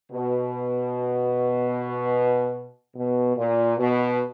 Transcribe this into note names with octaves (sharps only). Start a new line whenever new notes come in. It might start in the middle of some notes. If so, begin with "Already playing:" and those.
B2
B2
A#2
B2